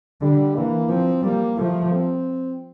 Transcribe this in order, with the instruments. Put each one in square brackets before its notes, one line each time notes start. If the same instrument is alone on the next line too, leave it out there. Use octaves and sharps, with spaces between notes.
[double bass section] D3 [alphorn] G3
[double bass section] E3 [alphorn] A#3
[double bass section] F3 [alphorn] C4
[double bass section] G3 [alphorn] A#3
[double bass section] F3 [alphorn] A3
[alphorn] C4